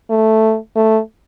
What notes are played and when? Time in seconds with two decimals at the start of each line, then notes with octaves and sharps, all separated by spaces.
0.10 A3
0.76 A3